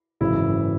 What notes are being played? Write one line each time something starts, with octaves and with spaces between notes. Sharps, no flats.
G#1 F#2 C#3 E3 E4